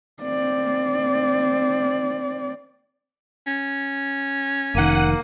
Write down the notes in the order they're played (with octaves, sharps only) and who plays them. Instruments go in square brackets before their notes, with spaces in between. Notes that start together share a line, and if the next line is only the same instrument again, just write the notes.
[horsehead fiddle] C4 D5
[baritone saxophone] C#4
[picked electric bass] F1 D#3 [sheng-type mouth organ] A#3 [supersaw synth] F#5 D#7